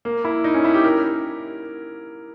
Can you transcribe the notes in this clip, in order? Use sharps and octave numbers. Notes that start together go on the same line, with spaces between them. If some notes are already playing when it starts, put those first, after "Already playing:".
A#3
E4
D#4
C#4
E4
G4
A#4